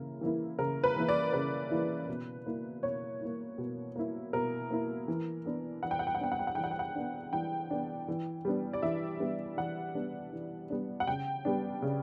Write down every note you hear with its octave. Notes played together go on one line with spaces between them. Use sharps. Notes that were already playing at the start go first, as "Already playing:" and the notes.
Already playing: C#3 E3 A#3 E4 A#4
E3 A#3 E4
C#3 A#4
B4
E3 A#3 E4
D5
C#3 B4
E3 A#3 E4
B2
A#3 E4
B2 C#5
A#3 E4
B2
A#3 E4
B2 A#4
A#3 E4
E3
B3 D4
E3 F#5
G5
F#5
G5
F#5
B3 D4 G5
F#5
G5
F#5
E3 G5
F#5
G5
F#5
B3 D4
E3 G5
B3 D4
E3
G3 B3 D4
D5
E3 E5
G3 B3 D4
E3 F#5
G3 B3 D4
E3
G3 B3 D4
F#5
C#3 G5
G3 B3 D4
C#3